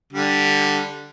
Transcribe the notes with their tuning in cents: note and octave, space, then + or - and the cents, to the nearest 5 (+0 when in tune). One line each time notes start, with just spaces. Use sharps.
D3 +0 G3 +0